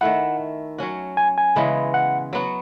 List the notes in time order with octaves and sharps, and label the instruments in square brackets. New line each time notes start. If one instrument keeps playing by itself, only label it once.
[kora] D#3 A3 E4 [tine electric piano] F#5
[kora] F#3 C#4 F#4
[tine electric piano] G#5
G#5
[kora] C#3 E3 G#3 B3
[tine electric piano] F#5
[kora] F#3 B3 F#4